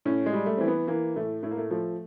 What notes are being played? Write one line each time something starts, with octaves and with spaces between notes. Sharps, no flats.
A2 C#4
G#3
G3
A3
E3 C4
B3
E3 A#3
A2 A3
A2 A3
A#3
A3
F3 A3